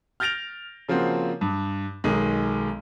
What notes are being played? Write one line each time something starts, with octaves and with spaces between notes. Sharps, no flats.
F6 G6 A6 A#6 D7 F7
C#3 F3 A#3 C4 F#4
G2
B1 D#3 G#3